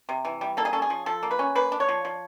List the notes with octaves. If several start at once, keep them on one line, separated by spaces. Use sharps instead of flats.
C3
E3
G3
A#3 A4
G#4
C#4 A4
G#4
F3
F3 A4
A#3
B4
C#4
A#3 B4
D4
C#5
F3
F3